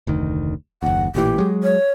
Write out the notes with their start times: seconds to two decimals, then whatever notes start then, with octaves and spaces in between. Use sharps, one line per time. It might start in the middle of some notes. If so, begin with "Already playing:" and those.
0.07 F1 D2 D#3
0.83 F#1 D#2 F#5
1.15 A1 A#2 E3 G4
1.38 F#3 G#3
1.63 C#5